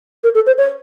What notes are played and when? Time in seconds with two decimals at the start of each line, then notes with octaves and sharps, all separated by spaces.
0.24 A#4
0.35 A4
0.47 C5
0.58 C#5